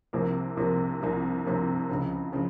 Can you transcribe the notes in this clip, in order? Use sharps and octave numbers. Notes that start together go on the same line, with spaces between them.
C2 C3 F3 A#3
C2 C3 F3 A#3
C2 C3 F3 A#3
C2 C3 F3 A#3
C#2 C#3 F3
C#3 F3